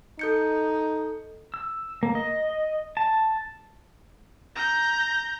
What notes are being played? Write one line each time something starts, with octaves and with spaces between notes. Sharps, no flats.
D#4 A4 G6 C#7
E6
A#3
D#5
A5
A#5 G6